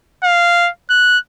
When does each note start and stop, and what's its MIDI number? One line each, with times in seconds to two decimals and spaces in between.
0.24 0.70 77
0.90 1.18 90